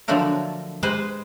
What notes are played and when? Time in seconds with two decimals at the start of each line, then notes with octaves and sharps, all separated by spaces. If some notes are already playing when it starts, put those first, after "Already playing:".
0.08 D3 F3 F#3 A3 D4 A#4
0.83 G#3 G4 B4 C5